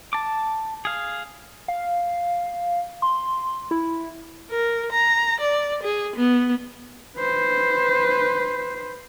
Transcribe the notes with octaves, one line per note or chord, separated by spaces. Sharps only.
A5 D6
G#4 F5
F5
C6
E4
A#4
A#5
D5
G#4
B3
B4 C5